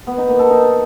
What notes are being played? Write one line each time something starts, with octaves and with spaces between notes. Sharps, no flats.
B3
D#4
A#3
A4
D#4